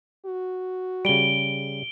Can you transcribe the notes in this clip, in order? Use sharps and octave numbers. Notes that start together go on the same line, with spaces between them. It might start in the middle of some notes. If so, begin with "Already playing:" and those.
F#4
C#3 G3 D7 G7